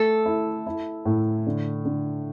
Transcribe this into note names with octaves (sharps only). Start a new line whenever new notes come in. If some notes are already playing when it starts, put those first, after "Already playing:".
Already playing: A3 A4
E4
E4
A2
D3
D3